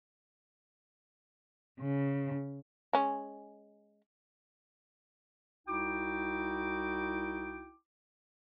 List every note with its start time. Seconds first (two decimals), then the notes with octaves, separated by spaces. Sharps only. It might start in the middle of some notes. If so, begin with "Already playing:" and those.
1.80 C#3
2.93 G#3 C#4
5.66 C2 D#4 E4 F#4 G5 D6